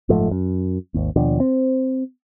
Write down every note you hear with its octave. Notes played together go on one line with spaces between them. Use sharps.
F#1 G#2 F3 A3
F#2
G#1 D#2
D#2 B2 F3 D4
C4